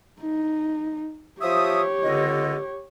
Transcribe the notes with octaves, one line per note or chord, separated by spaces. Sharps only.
D#4
F3 G4 C#5 E5 D#6
C#2 D3 D#5